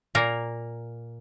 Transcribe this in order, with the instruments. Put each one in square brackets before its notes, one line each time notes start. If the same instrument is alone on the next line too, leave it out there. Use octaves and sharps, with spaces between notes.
[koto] A#2 A#3 A#4